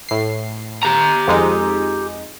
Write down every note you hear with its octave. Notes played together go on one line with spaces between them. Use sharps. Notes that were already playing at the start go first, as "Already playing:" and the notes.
A2 C7
G4 A#5
F2 G#3 D#4